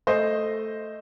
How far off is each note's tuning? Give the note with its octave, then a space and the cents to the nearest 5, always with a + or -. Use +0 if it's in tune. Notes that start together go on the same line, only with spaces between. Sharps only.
A3 +0 C5 +0 D#5 +0